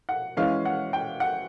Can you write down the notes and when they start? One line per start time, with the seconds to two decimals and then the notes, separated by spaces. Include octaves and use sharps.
0.09 F#5
0.37 E3 G#3 C#4 F5
0.65 F#5
0.93 G5
1.20 F#5